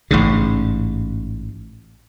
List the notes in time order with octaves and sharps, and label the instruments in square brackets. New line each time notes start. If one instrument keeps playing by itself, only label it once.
[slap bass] A1 G#2 C#3